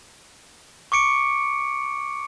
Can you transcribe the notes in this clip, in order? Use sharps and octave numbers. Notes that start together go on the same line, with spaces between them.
C#6 D6 C#7 D7